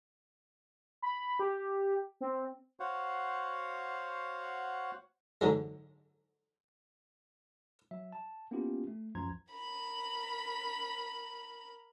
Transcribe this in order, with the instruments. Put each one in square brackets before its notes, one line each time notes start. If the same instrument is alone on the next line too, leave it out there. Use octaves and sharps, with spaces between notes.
[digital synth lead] B5
G4
C4
[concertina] F#4 C5 C#5 F5 F#5
[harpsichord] G#2 D3 F#3 G#3
[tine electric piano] F#3 E5
A5
A#3 B3 C#4 E4 F4 G4
A3
C#2 F#2 F3 A#5 C6 G#6
[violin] A#4 B5